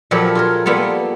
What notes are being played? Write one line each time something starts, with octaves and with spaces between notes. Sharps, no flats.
A#2 F3 F#3 G4 A4 B4
F4 G#4 A#4
G3 A#3 B3 F4 A4